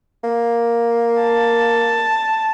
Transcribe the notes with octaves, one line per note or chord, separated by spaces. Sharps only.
A#3
A5